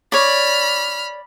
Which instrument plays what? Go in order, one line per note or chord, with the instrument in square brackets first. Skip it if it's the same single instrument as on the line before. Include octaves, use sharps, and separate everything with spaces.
[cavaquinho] C#5 D5 [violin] B5 F6